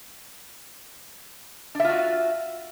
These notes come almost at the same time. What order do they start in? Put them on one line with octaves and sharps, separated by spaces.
D4 E5 F4 F#4